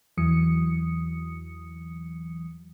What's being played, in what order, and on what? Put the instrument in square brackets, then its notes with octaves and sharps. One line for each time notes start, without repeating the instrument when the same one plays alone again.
[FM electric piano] E2 E3 F#3 D#6 C#7